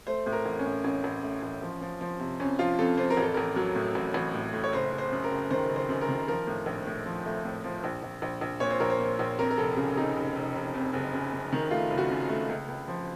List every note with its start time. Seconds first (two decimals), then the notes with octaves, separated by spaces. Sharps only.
0.07 A3 C5
0.26 A2
0.32 A#4
0.46 A1
0.59 C#4
0.66 A2
0.84 A1 C#4
1.04 A1
1.23 A3
1.42 A1
1.62 F3
1.81 F3
2.01 F3
2.20 C3
2.40 F2 C#4
2.59 F3 F4
2.78 F2 A4
2.97 F2 C5
3.10 A#4
3.17 A1
3.22 A4
3.34 A1 A#4
3.56 F#3
3.75 A2
3.95 A1
4.14 A1
4.34 A2
4.53 A2
4.63 C#5
4.72 F#1 C5
4.92 F#1
4.98 C5
5.12 F#2
5.24 A#4
5.31 F#1
5.50 D#3 C5
5.69 F#1
5.76 C5
5.89 F#2
6.01 A#4
6.08 D#3
6.28 F3 A#4
6.47 A2
6.66 A#1
6.86 A2
7.06 F3
7.25 A3
7.44 A2
7.64 F3
7.84 A#1
8.02 A#1
8.22 A#1
8.41 A#1
8.60 A#2 C#5
8.70 C5
8.80 A#1 A#4
8.90 C5
8.99 A#2
9.19 A#1
9.39 F2 A#4
9.50 A#4
9.57 F1 A4
9.77 C#3
9.97 C#3 D#4
10.16 F1
10.35 F1
10.55 F1
10.74 F2
10.94 F#1
11.13 F#2
11.33 F#2
11.52 D#3
11.71 A3 F4
11.90 F#1
11.98 F#4
12.10 F#2
12.30 A3
12.49 C#2
12.68 C#2
12.88 F3